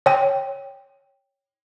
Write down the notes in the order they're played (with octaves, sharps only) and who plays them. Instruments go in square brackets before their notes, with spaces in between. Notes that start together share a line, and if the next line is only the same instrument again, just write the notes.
[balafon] C#5 G5